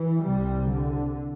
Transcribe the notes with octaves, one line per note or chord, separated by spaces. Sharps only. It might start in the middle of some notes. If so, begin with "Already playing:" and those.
Already playing: E3
C2 C3 G3
D3